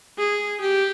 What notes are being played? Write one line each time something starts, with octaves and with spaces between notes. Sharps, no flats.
G#4
G4